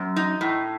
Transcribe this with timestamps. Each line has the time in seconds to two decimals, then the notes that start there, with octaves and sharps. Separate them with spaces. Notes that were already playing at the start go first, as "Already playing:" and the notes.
Already playing: F#2
0.16 D#4
0.41 A2